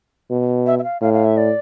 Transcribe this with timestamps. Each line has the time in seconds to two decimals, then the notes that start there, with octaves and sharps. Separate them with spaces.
0.30 B2
0.66 E5
0.79 E5
0.84 F5
1.01 A2 F5
1.13 F5
1.25 E5
1.37 D5